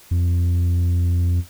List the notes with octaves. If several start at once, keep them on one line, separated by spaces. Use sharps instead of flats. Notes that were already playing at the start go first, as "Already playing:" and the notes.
F2